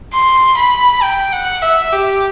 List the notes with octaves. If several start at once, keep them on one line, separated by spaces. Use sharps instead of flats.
C6
B5
G5
F#5
E5
G4